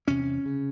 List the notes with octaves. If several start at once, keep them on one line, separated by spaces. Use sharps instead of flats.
E2 C3 C#4
C#3